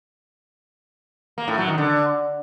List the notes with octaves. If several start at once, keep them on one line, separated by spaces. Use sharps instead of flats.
A#3
A2
F#3
D#3
D3